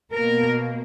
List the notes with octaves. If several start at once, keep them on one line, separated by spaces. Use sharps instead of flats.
B2 A#3 A#4